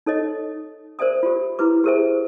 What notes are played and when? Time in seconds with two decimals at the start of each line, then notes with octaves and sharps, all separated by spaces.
0.06 D#4 A4 C#5 D#5
0.99 A#4 C5 D5 E5 G#5 D#6
1.23 F4 G4
1.59 E4 G4 B4 D6
1.84 G4 G#4 A#4 C5 E5 G#5